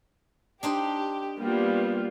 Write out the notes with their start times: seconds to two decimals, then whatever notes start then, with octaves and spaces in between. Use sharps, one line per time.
0.63 D4 D#4 G4 C5
1.39 G3 A#3 B3 F4